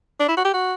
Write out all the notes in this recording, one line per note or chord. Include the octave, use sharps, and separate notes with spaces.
D4
E4
F#4
G4
F#4